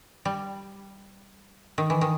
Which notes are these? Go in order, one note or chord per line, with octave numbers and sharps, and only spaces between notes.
G3
D#3
E3
D#3